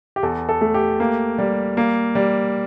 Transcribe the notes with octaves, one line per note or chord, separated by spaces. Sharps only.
G4
E2 A4
A4
A3
G4
A#3
G3
A#3
G3